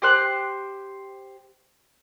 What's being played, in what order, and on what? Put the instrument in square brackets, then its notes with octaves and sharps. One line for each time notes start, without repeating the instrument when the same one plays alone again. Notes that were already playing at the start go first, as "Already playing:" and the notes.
[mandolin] G4 C5 F#6